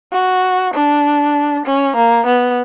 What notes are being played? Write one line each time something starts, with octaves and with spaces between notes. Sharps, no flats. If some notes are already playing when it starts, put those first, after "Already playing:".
F#4
D4
C#4
A#3
B3